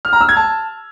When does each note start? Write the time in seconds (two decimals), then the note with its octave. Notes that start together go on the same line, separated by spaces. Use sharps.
0.05 F6
0.13 A#5
0.21 E6
0.29 G#6
0.37 A5